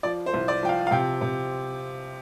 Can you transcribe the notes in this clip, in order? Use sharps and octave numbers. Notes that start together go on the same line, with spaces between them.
F3 D5
C5
C2
D5
F3 G5
F5
F5
C3 G5
C3